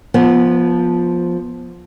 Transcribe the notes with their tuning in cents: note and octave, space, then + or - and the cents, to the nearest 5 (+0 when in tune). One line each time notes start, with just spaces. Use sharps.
F3 +5 B3 -25